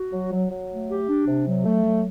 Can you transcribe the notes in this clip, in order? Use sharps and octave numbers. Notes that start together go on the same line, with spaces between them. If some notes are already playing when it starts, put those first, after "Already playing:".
Already playing: F#4
F#3
F#3
F#3
A3
G4
D4
C3
F#3
A3
F#3